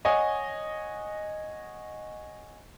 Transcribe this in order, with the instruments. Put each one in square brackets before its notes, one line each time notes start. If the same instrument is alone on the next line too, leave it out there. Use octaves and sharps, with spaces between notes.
[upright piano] C#5 D#5 F#5 G#5